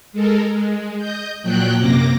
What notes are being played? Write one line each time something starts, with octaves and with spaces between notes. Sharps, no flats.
G#3 A4 A#4
G#3
D#5 G6
A#2 F3 F#3 G5 F#6 G6
F#2 C3 A#3 D6 A#6